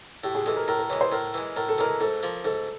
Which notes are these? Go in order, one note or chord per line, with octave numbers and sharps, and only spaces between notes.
A2 G4
G#4
E3 G#3 A4
A#4
A2 A#4
A#4
E3 G#3 C#5
C5
A2 A#4
E3 G#3
A2 A#4
A4
E3 G#3 A#4
G#2 A4
F3 A#3
G#2 A4